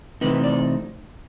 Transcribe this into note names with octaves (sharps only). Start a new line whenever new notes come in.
C3 E3 A3 C4 D#4 B4
D5